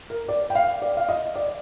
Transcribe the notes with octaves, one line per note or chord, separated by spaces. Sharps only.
A#4
D5
G5
F5
D5
F5
D#5
D5